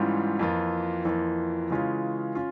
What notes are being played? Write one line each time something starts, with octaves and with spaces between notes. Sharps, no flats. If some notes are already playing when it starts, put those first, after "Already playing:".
Already playing: G#2 E3 G3 C#4 F4
F2 E3 A#3 F4
F2 E3 A#3 F4
C#3 E3 G#3 C#4 F4
C#4 F4